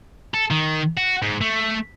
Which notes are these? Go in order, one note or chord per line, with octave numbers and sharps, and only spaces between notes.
A4
D#3
F#4
G#2
A3